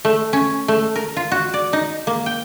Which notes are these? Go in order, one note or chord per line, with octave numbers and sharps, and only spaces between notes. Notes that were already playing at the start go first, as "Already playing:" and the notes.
A3
C#4
A3
A#4
F4
F#4
D5
D#4
A#3
G5